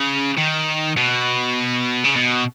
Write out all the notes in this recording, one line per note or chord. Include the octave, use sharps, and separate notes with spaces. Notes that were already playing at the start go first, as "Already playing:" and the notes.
Already playing: C#3
D#3
B2
C#3
B2